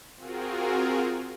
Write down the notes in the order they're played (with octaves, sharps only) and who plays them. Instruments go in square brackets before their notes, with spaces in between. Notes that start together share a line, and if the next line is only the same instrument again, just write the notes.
[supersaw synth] C4 F4 F#4 G#4 A#4